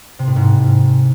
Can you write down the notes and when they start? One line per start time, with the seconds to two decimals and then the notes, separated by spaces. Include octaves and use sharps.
0.19 C3
0.28 A2
0.36 G#2